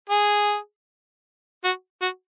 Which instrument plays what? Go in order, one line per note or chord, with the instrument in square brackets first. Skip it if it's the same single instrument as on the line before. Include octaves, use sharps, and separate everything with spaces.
[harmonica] G#4
F#4
F#4